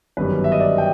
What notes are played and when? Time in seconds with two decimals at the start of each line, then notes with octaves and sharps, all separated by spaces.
0.17 G1 F#2 D#3 G3 B4
0.44 E5
0.52 D#5
0.60 D5
0.78 G5